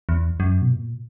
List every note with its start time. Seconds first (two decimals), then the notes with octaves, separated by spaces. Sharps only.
0.09 E2
0.40 F#2
0.62 B2
0.72 A#2